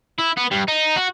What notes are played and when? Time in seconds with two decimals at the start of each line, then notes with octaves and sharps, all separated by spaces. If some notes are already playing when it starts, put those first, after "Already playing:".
0.18 E4
0.37 B3
0.51 G2
0.68 D#4
0.96 F#4